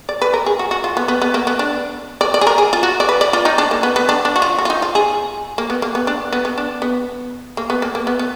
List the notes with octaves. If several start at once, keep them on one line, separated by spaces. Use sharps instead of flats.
D5
B4
A#4
G#4
F#4
F#4
F4
B3
B3
B3
A#3
B3
D4
D5
D5
G#4
A#4
G#4
F4
F#4
D5
B4
D5
F4
D#4
D4
A#3
B3
B3
D4
D4
F#4
F4
F#4
F4
D#4
F4
G#4
A#3
B3
A#3
B3
D4
B3
B3
D4
B3
A#3
B3
A#3
A#3
B3
B3